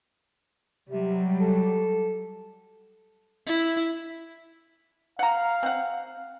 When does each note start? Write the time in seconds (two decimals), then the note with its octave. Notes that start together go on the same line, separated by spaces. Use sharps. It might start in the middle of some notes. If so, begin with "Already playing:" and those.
0.90 C3 F#3 G3
1.40 A4
3.46 E4
5.19 F5 F#5 A#5
5.63 C4 F#5